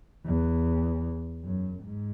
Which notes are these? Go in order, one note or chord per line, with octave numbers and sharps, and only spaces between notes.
E2
F#2
G#2